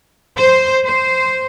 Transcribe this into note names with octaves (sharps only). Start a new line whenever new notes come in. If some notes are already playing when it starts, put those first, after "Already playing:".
C5
C5